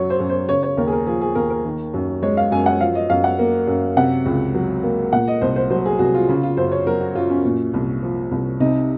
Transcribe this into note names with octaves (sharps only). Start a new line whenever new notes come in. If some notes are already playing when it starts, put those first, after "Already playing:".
Already playing: F#2 F#3 C#5
C5
F#2
C5
C#3 C#5
C#5
D#2 A#4
G#4
A#4
F3 G#4
G#4
D#2 A#4
A#4
D#3
F#2
G#3 C#5
F5
F#2 G#5
F#5
F3 F5
D#5
F#2 F5
F#5
A#3
F#2
C3 F#5
C#2
F#3
A#3
A#2 F#5
D#5
C2 C5
C5
F#3 C5
G#4
C2 F#4
F4
C#3 F4
F4
F#2 C5
C#5
F#3 A#4
F#4
F#2 F4
C#4
A#2
C2
F3
C2
C3 D#4